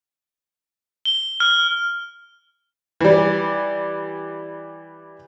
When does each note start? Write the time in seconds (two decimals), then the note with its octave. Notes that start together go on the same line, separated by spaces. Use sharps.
1.05 G7
1.40 F6
3.01 E3 G3